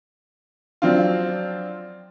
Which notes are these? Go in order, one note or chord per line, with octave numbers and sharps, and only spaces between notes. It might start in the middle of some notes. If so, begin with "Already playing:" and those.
F3 F#3 C4 D4 F4